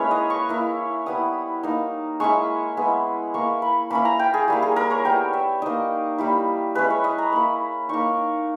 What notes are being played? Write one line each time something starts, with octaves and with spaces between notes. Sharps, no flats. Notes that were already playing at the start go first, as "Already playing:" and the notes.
Already playing: G#3 A#3 C#4 E4 B4 C#5
D#5
C#6
A#3 E4
G3 B3 E4 D#6
A#3 D#4
G#3 C#4 E4 C#6
G#3 B3 E4
A#3 E4 C#6
B5
A#3 C#4 E4 B5
A#5
G5
G#4
G3 A#3 E4
G#4
A#4
C#5
G3 B3 E4 G5
E5
A#3 D#4 D#5
G3 A#3 E4
G#3 C#4 E4 B4
C#5
D#5
A#5
A#3 E4 B5
A#3 D#4 C#6